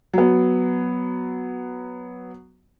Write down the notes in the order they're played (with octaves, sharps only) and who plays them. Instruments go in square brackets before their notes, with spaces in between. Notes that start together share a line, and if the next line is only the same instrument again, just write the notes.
[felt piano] F#3 B3